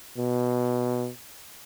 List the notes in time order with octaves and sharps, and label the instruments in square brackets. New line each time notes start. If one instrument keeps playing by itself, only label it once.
[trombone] B2